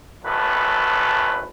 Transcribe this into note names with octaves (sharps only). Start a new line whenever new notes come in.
G#1 F#2 A2 A4 B4